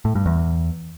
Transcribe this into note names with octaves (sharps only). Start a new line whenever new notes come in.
A2
G2
E2